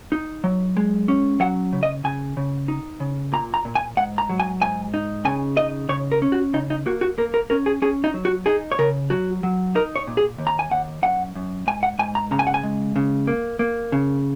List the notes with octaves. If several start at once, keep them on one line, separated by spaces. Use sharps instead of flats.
D#4
F#3
G#3
C#4
F#3 F#5
C#3
D#5
C#3 G#5
C#3
D#4
C#3
A#2 A#5
A#5
A#2
G#5
G#2 F#5
A#5
F#3
G#5
G#2 G#5
D#4
C#3 G#5
D#4 D#5
C#3 C#5
A#4
C#4
F#4
C#3 D#4
D#4
A#3 F#4
F#4
A#3 A#4
A#4
C#4 A#4
G#4
C#4 G#4
D#4
F#3
F#4
D#4 G#4
C#5
C#3 A#4
F#3 F#4
F#3
D#4 A#4
C#5
A#2
G#4
D#2
A#5
G#5
D#2 F#5
F#2 F#5
F#2
G#2 G#5
F#5
G#2 G#5
A#5
C#3 A#5
G#5
F#5
G#5
G#3
C#3
A#3
A#3
C#3